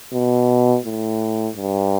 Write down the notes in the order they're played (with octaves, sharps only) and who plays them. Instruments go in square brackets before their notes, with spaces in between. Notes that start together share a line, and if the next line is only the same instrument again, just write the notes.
[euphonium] B2
A2
G2